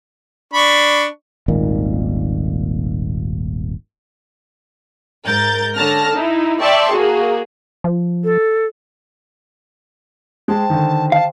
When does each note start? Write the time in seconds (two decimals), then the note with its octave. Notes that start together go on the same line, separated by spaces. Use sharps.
0.53 D4 B5 C#6
1.48 D#1 G#1 A#2 D#3
5.25 G#2 A#4 G6 A6
5.75 D3 C#4 A5 F6 A#6
6.14 D#4 E4
6.61 D5 E5 G5 A5 C6 C#6
6.91 A#3 F#4 G#4
7.84 F3
8.24 A4
10.48 G#3 G4 C5 A5
10.70 D3 D#3
11.12 F5 A5